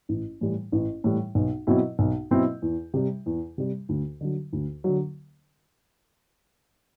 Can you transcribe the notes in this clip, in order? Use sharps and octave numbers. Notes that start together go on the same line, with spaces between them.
A1
A2 E3 G3
A1
A2 E3 G3
B1
B2 F#3 C4 E4
B1
B2 F#3 C4 E4
E2
C3 G3
E2
C3 G3
D2
D3 F#3
D2
D3 F#3